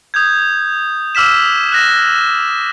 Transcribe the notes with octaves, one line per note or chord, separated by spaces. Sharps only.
D#6 G6 G#6
D6 E6 F6 B6 E7
F#6 A#6 E7